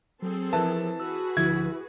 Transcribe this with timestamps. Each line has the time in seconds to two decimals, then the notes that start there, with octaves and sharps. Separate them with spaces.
0.22 F#3 C4 G#4 A4
0.53 E3 F3 A#4 A5
1.00 F#4 G#4 B4 E6
1.37 D2 D3 F3 E4 G#6